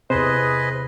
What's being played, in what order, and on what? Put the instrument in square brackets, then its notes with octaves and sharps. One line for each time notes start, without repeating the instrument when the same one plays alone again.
[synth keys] E2 C3 [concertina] G#4 B4 D#5 [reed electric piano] C5